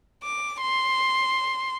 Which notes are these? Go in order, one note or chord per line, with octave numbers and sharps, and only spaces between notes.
D6
C6